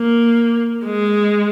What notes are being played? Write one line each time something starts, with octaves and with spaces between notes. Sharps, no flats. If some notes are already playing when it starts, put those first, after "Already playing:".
Already playing: A#3
G#3